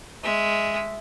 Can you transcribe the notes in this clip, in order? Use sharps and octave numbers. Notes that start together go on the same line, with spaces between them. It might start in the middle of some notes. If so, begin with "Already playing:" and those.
G#3 E5